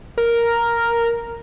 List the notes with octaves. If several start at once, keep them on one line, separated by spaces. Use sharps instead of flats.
A#4